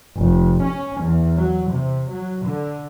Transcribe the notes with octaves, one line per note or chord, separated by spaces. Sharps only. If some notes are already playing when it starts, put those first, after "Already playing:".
F1
C#4
E2
F#3
C3
F#3
D3